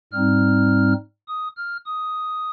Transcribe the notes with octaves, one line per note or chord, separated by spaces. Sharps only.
G#2 G3 C4 D#4 F6
D#6
F6
D#6